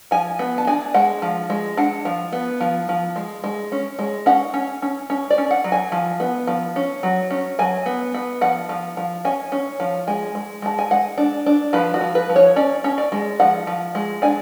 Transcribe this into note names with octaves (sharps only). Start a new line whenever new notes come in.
F3 G#5
B3
A5
D4 G#5
G#3 F#5
F3
G#3
D4 F#5
F3
B3
F3
F3
G#3
G#3
C#4
G#3
C#4 F#5
C#4
C#4
C#4
D5
C#4
F#5
F#3
G#5
F3
B3
F3
C#4
F#3
C#4
F#3 G#5
B3
B3
F3 F#5
F3
F3
C#4 G#5
C#4
F3
G#3 G#5
G#3
G#3 A5
G#5
G#3 F#5
D4
D4
F3 B4
F#4
F3
B4
F3
C#5
C#4 D5
C#4
D5
G#3
F3 F#5
F3
G#3
D4 G#5